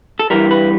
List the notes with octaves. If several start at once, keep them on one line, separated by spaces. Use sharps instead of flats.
A4
G2 E3 G3 A#4
B4